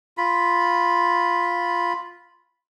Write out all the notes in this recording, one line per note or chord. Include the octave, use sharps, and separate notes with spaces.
F4 B5